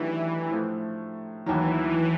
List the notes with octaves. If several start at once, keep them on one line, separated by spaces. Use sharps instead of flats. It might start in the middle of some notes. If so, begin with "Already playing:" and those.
Already playing: D#3 E3 F#3 A3 D4 G4
A2 F3 A3
D#2 D#3 E3 F#3